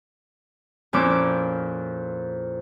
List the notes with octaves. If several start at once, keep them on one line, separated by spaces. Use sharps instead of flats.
F2 A#2 F3 C#4 E4 D6